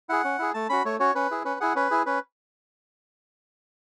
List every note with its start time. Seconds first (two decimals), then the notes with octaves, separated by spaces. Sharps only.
0.09 E4 G#4 F#5
0.24 C#4
0.39 E4 G#4
0.54 A3 A5
0.69 C#4 F#4 B5
0.85 A3 C#5
1.00 C#4 F#4 C#5
1.15 C#4 B4
1.31 E4 G#4
1.45 C#4 B4
1.60 E4 G#4 F#5
1.75 C#4 B4
1.91 E4 G#4
2.06 C#4 B4